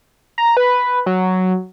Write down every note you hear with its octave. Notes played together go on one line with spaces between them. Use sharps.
A#5
B4
F#3